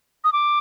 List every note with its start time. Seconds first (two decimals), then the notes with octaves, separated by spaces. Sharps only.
0.24 D#6
0.33 D6